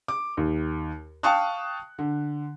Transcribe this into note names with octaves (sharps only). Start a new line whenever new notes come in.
D6
D#2
F5 G5 A5 C#6 D#6 F#6
D3